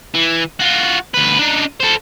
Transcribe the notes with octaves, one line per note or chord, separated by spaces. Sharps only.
E3
F4 F#4
D2 B4
D4 D#4
A4 C5